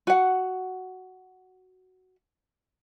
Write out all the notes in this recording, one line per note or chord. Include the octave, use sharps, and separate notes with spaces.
F#4 F#5